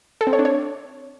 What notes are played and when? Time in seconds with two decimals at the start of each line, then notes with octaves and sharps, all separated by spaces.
0.21 A4
0.27 C4
0.33 C#5
0.39 D4
0.45 C#5